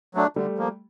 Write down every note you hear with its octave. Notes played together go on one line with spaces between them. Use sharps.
F#3 A3 D4
D3 G3 A3
F3 A#3